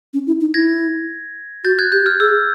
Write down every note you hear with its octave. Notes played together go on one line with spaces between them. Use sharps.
C#4
E4
D#4
E4 G#6 A#6
F#4 G6 A6
F#6 G#6
G4 G6
F6
G#4 E6